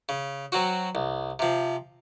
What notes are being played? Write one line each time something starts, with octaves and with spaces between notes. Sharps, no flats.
C#3
F#3 C4 F#4
C2
C3 F3